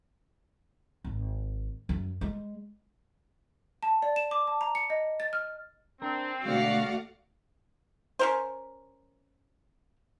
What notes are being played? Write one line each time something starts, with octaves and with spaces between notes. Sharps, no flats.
G#1
F#2
G#3
A5
D5
E7
D6
A5
A#5
C#7
D#5
A6
F6
C4 D4 A#4
B2 D3 G#3 A3 F#4 D5 F5 F#5
C#4 A#4 C5